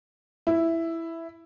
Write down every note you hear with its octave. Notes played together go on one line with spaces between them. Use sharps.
E4